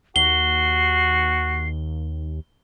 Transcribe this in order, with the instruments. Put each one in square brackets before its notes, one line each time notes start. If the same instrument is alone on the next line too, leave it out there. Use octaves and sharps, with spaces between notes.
[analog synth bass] D#2 [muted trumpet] F#4 [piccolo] C7 [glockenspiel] G7